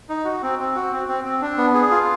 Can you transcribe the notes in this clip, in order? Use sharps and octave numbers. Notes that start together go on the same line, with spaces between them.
D#4
F#4
C4
C4
F#4
C4
C4
C4
D4
B3
G#4
F4